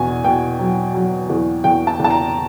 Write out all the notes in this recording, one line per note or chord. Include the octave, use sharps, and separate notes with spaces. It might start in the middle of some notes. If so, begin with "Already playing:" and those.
Already playing: E2 B2 G#5
B2 G5
F#3
F#3
E2
E2 G5
A5
E2
A5
A#5